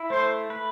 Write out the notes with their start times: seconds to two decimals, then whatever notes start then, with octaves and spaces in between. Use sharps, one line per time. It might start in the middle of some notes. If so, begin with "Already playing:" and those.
Already playing: E4
0.10 A3 C5
0.50 B4